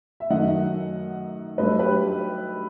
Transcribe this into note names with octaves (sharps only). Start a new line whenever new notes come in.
E5
F#2 D#3 A3 D#5 F#5
G2 F#3 A3 B4 D#5
G4 B4